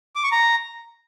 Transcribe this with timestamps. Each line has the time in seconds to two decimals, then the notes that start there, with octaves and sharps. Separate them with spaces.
0.16 D6
0.24 C#6
0.32 A#5